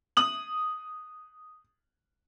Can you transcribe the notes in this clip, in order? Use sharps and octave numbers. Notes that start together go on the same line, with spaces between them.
D#6 F#7